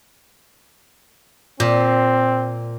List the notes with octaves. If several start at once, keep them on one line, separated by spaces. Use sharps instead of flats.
A#2 C4